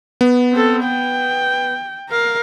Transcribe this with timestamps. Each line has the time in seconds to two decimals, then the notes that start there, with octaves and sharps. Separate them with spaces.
0.21 B3
0.52 C4 A4
0.84 G5
2.10 A#4 F5